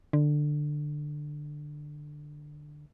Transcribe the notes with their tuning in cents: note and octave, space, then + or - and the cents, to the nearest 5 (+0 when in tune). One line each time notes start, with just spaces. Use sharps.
D3 +15